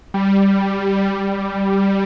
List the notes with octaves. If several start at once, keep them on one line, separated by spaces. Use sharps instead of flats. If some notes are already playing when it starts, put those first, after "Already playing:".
G3